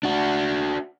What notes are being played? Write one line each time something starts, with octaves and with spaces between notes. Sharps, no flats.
D4 F#4